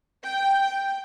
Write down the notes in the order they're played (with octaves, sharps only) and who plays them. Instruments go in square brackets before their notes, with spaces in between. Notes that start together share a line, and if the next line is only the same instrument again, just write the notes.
[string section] G5